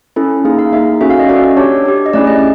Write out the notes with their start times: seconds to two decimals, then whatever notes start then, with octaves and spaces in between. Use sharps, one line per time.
0.16 C#4 E4 A4
0.45 A#3 D#4 G#4
0.59 F5
0.73 A#3 D#4 G#4 E5
1.01 C#4 F#4 A4 E5
1.10 F5
1.20 D#5
1.29 C#4 F#4 A4 D5
1.57 D4 G4 C#5
1.85 D4 G4
2.06 D#5
2.13 A3 C#4 E4 G#4 D5
2.27 D#5